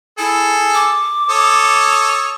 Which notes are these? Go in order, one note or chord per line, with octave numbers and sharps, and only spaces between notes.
E4 G#4 A4
D6
A4 C#5 D#6